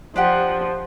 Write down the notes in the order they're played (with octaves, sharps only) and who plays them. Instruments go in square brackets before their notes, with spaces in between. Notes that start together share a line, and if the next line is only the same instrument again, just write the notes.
[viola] F3 [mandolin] D4 G4 F#5